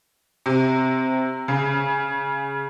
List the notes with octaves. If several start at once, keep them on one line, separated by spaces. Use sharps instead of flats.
C3
C#3